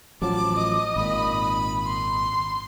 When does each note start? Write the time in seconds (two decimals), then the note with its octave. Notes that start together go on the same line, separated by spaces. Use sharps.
0.22 A1 F3 F#3 A5 D6
0.54 D#5
0.96 G#1 A#2 B5
1.87 C6